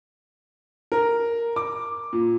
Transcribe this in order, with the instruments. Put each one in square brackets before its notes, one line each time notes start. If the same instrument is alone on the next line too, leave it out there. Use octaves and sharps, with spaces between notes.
[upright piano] A#4
D6
A#2